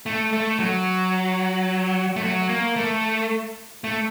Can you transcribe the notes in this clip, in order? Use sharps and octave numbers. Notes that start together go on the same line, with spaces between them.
A3
A3
F#3
A3
F#3
A#3
A3
A3